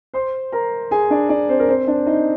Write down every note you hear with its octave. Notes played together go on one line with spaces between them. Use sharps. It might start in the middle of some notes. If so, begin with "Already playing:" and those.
C5 C6
A#4 A#5
G#4 G#5
D4 D5
D4 D5
C4 C5
A#4
C4 C5
D4 D5
D#4 D#5